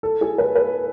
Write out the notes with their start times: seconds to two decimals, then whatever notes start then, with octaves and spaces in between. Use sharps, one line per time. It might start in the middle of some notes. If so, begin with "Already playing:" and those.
0.03 A4
0.21 G#4
0.38 B4
0.55 B4